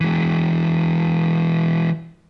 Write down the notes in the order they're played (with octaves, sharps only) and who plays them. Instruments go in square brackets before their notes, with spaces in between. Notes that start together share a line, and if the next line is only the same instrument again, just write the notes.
[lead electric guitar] E3 G#3